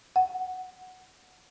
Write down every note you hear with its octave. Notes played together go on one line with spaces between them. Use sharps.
F#5